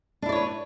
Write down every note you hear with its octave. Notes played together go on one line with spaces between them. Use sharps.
D4 E4 B4 C#5 D5